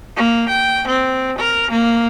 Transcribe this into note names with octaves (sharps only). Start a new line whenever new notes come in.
A#3
G5
C4
A#4
A#3